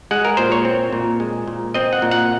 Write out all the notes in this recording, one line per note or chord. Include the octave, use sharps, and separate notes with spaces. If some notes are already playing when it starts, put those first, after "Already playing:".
G#3 F#5
A#4
A#2 C5
C#5
C4
A#2
G#3
A#2
C4 D#5
F#5
A#2
F#5